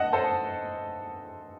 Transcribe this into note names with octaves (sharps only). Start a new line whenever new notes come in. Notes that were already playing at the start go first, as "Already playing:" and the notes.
Already playing: D#5 F#5 A5
A4 C5